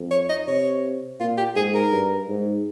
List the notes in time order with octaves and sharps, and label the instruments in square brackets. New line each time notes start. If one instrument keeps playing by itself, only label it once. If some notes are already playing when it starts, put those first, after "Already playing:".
Already playing: [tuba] F2
[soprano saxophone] C#5
D#5
[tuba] C3 [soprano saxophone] C#5
[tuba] A#2 [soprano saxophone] F4
[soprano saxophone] G4
[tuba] G#2 [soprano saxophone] G#4
[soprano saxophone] A#4
[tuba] G2
G#2